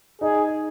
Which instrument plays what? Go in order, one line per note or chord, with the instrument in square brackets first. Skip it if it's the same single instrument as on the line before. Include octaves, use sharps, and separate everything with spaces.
[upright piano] D#4 [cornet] G#4